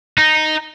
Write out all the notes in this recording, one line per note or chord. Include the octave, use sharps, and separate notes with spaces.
D#4